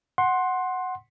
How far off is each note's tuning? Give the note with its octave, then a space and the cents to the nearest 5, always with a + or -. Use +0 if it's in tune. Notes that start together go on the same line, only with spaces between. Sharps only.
F#5 +0 C6 +15